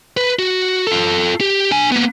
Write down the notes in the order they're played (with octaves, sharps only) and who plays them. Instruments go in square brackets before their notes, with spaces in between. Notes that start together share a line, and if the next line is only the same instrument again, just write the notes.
[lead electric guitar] B4
F#4
F4 A4
G4
D4 G#5
A#3 B3